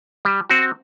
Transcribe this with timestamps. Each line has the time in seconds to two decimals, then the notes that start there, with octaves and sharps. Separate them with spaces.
0.25 G3
0.50 C4 F#4